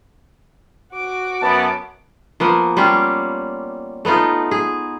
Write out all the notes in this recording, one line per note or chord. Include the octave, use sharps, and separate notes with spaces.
F#4 D6
F#2 B3 A5
F3 A#3 B3
G3 C#4 F4 G4
A3 B3 D#4 F4
G#4